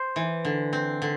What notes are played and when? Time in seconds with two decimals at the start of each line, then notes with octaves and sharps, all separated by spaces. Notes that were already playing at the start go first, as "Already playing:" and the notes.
Already playing: C5
0.16 E3
0.45 D3
0.73 C4
1.02 D3